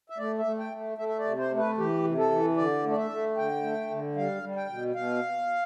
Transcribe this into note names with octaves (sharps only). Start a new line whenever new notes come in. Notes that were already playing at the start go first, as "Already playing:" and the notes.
E5
A3 D5
E5
A3
G5
A3
A3 E5
E5
D5
C3
C5
A3
B4
E3 G4
C3
A4
E3
D3 D5
A3
D5
E5
A3
D3 G5
A3
D3
G3 F5
G3
G5
B2
B2 F5